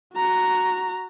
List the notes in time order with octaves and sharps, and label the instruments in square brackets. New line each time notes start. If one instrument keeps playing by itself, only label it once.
[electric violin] F#4 A#5